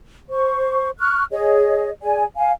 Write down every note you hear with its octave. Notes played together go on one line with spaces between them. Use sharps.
C5 C#6
C#6 F6 F#6
G#4 C#5 D#5
G#4 D5 G#5
F5 G#5